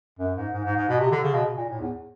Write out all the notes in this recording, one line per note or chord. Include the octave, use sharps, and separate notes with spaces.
F#2
G#2
G#2
G#2
G#2
B2
C3
D3
C#3
B2
A#2
A2
E2